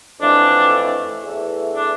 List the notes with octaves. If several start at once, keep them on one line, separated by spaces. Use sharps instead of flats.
F2 E3 A3 D4
E2 E3 A3
D4